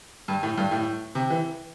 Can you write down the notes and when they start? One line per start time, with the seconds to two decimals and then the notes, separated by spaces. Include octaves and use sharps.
0.28 G2
0.43 A2
0.58 G2
0.71 A2
1.15 C3
1.30 E3